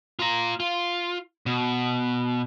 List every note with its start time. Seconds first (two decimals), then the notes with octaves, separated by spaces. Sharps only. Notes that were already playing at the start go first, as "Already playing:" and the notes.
0.19 F4 A#5
0.60 F4
1.46 B2